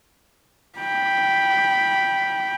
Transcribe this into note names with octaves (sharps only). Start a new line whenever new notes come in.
G5 B5